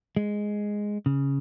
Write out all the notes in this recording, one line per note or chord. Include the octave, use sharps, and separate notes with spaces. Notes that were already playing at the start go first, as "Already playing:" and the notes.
G#3
C#3